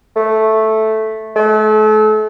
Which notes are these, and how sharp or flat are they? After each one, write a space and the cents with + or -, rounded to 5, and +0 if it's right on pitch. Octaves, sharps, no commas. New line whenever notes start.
A3 -5
A3 -35